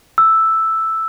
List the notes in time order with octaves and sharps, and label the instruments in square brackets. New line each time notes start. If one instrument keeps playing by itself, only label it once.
[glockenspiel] E6